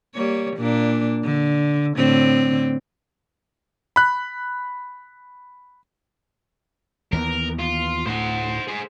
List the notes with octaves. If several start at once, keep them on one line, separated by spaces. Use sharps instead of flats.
G3 A#3 C#5
A#2 A#3 D4
D3
A2 D3 C4
B5 F#6
D#2 E3 B3 A#4
F4
D2 A2 C5 F#5
G#4 C5